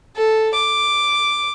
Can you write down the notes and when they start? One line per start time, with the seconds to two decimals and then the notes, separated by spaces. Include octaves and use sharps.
0.17 A4
0.55 D6